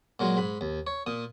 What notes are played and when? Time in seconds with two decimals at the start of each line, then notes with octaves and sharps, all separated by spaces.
0.20 A#2 F#3 G#3
0.37 G#2 B5
0.61 D#2
0.87 C#5
1.07 A#2 D#6